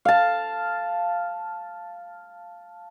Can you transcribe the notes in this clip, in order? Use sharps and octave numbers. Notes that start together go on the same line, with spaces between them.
F5 A5